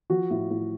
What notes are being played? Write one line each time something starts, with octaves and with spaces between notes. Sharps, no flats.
F3 F#4
A2
A2